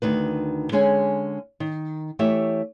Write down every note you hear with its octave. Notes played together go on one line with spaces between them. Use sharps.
D2 D#3 B4
D3 G#3 C#4 G#4 G#5
D#3
E3 A3 G4 C#5 E5